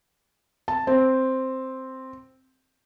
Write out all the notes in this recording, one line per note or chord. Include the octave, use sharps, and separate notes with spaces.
A5
C4